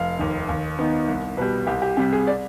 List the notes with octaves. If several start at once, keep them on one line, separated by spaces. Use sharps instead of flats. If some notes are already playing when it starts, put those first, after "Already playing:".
Already playing: F1 F5
D#2 D#3
D#2
D#3 B3 D#4
C2
B2 G3 B4
C2 G4
G4
C3 G3 G4
G#4
D5